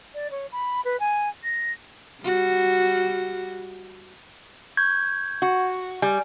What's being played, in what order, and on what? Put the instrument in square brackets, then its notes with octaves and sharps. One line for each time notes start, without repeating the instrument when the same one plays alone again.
[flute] D5
C#5
B5
B4
G#5
A#6
[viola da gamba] G3 F#4
[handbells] C#6 G6 G#6
[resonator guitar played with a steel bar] F#4
[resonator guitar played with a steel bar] G3 [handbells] G#5